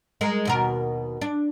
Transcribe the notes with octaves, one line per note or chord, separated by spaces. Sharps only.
G#3 A#4
D#2 B2 A#4
D4